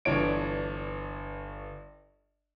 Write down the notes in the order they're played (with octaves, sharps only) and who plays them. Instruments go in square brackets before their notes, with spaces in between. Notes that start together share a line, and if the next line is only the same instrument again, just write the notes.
[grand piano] G1 E3 D4 C#5 D7